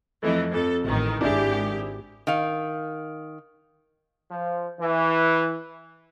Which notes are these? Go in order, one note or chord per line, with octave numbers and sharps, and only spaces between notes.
F2 E3 A3 D#5
F2 A4
A1 D#3
G#1 D4 E4 G4 G#4
D#3 F5
F3
E3